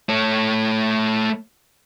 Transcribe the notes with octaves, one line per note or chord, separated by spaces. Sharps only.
A3 C#5